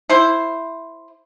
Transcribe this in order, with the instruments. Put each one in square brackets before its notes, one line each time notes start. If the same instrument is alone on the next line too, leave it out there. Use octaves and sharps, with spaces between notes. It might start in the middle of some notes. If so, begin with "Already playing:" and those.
[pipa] E4 C5